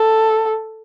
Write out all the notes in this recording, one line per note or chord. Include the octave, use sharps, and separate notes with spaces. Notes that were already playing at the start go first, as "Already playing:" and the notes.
Already playing: A4